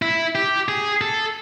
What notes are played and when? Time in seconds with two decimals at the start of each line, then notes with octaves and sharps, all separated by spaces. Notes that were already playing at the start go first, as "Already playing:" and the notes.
0.02 E4
0.35 G4
0.69 G#4
1.01 A4